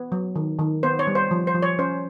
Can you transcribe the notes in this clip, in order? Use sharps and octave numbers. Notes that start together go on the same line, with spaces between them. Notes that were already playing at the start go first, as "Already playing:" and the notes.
Already playing: B3
F#3
D#3
D#3
B3 C5
C#5
G3
C5
F3
C5
F3
C#5
C#4 C5